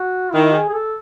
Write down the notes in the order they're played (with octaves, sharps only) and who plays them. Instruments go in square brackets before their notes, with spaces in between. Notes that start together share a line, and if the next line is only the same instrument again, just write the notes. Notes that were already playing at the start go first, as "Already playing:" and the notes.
Already playing: [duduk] F#4
[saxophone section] D#3 [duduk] E4
[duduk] G#4
G#4
A4